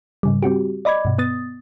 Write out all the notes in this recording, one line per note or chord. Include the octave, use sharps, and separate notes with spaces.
G#2 C#3 G3
G3 C4 F#4 G4
D5 D#5 B5 D6 G#6
G2 B2
B3 D#6 A6